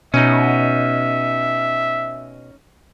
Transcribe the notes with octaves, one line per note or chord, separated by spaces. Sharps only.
B2 C#4 D#4 E5